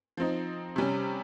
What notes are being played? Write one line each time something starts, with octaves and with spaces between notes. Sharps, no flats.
F3 C4 D#4
C3 G3 C#4